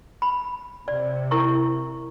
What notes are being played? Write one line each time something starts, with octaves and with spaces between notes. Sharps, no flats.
B5
C3 D5
E4 A#4 C#6